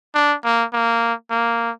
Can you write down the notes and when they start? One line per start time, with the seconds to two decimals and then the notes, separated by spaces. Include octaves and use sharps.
0.15 D4
0.44 A#3
0.73 A#3
1.30 A#3